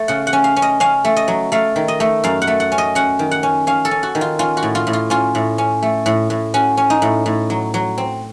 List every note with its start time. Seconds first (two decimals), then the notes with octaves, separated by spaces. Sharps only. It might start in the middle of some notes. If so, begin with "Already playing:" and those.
Already playing: A3
0.08 C#3 F#5
0.27 F#5
0.33 C#4
0.44 F5
0.56 C#4
0.62 D#5
0.80 C#4 F5
1.04 A3
1.16 D#5
1.28 F#3
1.52 A3 F5
1.76 D#3
1.88 D#5
2.00 A3
2.24 F#2 F5
2.42 F#5
2.47 A3
2.60 F#5
2.72 C#4
2.78 D#5
2.95 C#4 F#5
3.19 D#3
3.31 F#5
3.43 C#4
3.67 C#4 F5
3.85 A4
3.91 C#4
4.03 F#4
4.15 D#3
4.21 F4
4.39 C#4 F4
4.57 F#4
4.63 A2
4.75 F4
4.87 A2
4.93 F4
5.10 C#4 F4
5.35 A2
5.58 C#4
5.82 A3
6.06 A2
6.30 A2
6.54 C#4 F#4
6.77 C#4
6.90 D#4
7.02 A2
7.26 A2
7.50 F#3
7.74 F#3
7.98 C4